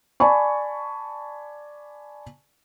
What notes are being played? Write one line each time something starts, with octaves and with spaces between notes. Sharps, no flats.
D5 G#5 A5 B5 C#6